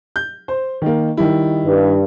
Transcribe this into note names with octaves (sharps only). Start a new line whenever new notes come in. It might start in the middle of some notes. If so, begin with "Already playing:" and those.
G6
C5
D#3 A#3
D#3 G3 E4
G2